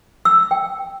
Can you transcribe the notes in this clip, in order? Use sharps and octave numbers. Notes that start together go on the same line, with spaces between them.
E6
G5